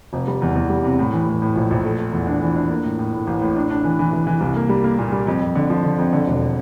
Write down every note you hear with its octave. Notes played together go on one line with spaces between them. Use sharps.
F1
G3
E2
E2
G3
C3
A2
E3
A2
A2
A#1
A#1
A3
A3
E2
D4
E3
D4
A#3
A2
A2
A2
A1
A2
D4
D4
E3
E3
E3
E3
C2
A#3
G3
A#3
A#2
G3
F2
F2
D3
F3
D3
F2
D3
E1